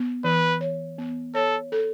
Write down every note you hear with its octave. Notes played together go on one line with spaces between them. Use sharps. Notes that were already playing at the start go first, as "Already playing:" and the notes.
Already playing: B3
E3 B4
C#5
B3
A4 C#5
A4